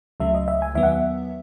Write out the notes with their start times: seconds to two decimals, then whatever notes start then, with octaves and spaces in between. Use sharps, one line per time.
0.20 C#2 C#3 F#3 A3 E5
0.34 D#5
0.48 E5
0.62 G#5
0.75 D#2 D#3 F#3 B3 E5
0.83 F#5
0.92 E5